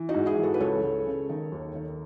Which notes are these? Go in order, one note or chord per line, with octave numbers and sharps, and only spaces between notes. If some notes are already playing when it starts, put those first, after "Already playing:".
Already playing: E3
D#4 F#4
G#2
E4 G#4
E3
F#4 A4
B4
C#2 A4 C#5
C#2
C#3
D#3
D#2
D#3